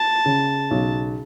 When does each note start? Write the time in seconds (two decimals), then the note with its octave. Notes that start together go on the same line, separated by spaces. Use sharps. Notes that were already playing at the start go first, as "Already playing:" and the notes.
Already playing: A5
0.26 C#3
0.71 B1